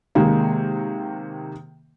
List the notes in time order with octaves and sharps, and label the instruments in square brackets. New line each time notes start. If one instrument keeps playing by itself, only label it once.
[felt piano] C3 D#3 G#3 A#3